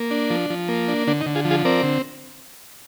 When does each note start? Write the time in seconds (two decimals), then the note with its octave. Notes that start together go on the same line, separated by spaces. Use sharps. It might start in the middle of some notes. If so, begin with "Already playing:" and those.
Already playing: A#3
0.11 D4
0.30 F3
0.50 F3
0.68 A#3
0.88 D4
1.07 D3 D4
1.21 D#4
1.26 D3
1.35 F4 G#4
1.45 F3
1.50 F4 G#4
1.65 C4 A#4 D5
1.83 D3